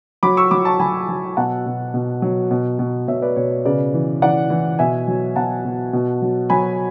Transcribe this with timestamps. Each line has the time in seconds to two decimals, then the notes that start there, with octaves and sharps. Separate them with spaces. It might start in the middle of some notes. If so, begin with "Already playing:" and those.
0.23 F#3 B5 D6
0.37 C#6 E6
0.51 F#3 B5 D6
0.65 A5 C#6
0.80 F#3 G#5 B5
1.09 F#3
1.37 B2 F#5 A5
1.66 B2
1.94 B2
2.22 F#3
2.51 B2
2.79 B2
3.08 B2 C#5 E5
3.22 B4 D5
3.36 B2 C#5
3.51 C#5
3.65 C#3 B4 D5
3.94 E3
4.22 E3 D5 F#5
4.50 E3
4.79 B2 E5 G#5
5.08 F#3
5.36 B2 F#5 A5
5.65 B2
5.93 B2
6.22 F#3
6.50 F#3 G#5 B5